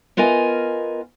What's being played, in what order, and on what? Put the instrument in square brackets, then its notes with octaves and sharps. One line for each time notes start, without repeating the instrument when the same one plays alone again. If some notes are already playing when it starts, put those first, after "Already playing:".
[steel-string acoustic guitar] B3 F4 A#4 D#5 G#5